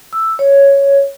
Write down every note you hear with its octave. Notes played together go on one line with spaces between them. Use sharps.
E6
C#5